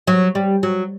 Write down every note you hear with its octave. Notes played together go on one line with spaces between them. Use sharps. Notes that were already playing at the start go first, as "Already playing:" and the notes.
F#3
G3
F#3